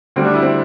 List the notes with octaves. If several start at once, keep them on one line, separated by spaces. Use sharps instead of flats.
D2 D3 G3 C4
D4
E4
C4